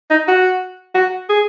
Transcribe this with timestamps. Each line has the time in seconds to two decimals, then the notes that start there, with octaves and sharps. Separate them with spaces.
0.10 D#4
0.28 F#4
0.95 F#4
1.29 G#4